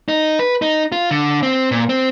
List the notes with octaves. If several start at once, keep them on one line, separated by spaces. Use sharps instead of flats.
D#4
B4
D#4
F4
D3
C4
A#2
C4